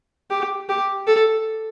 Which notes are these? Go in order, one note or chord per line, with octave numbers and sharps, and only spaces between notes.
G4
G4
A4